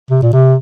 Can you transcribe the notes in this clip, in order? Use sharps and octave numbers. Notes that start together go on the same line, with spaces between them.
C3
A#2
C3